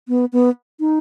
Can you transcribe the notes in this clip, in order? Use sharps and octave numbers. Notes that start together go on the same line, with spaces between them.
B3
B3
D#4